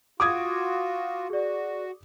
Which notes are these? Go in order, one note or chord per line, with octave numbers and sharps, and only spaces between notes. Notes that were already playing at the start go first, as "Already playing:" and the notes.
F4 F#4 D6 D#6 G#6
F#4 G#4 D5